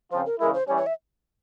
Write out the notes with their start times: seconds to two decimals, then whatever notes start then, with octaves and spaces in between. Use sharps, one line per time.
0.11 C#3 F3 C4 F4 C5
0.26 A#4
0.39 C#3 E3 G#3 E4 A#4
0.54 C5
0.67 E3 G3 C#4 C#5
0.77 C#5
0.86 E5